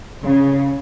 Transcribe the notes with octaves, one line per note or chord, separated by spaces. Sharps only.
C#3